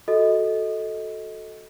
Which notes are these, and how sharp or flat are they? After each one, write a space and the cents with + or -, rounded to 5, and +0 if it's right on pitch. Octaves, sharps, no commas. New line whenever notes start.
F#4 +0 A4 +0 D#5 +20